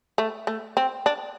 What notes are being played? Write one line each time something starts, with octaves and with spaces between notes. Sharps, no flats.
A3
A3
C4
D4